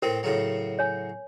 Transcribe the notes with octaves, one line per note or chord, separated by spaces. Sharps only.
A2 C4 A#4
A2 C#3 F#3
C#5 G#5